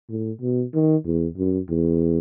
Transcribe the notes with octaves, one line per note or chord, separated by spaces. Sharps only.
A2
B2
D#3
E2
F#2
E2